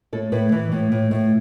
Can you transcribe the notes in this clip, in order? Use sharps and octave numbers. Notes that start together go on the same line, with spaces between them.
A2 A4
A2 B4
E3
A2
A2
A2